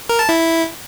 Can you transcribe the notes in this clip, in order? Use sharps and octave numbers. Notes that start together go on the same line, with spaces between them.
A#4
A5
E4